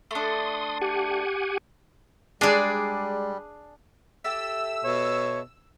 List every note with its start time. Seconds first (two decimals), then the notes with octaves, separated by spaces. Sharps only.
0.11 A3 D4 C6 D#6
0.81 G4 F#5 G#5
2.41 G3 G#3 D4 G#4 D5
4.24 G4 A4 E5 E6
4.85 B2 C#5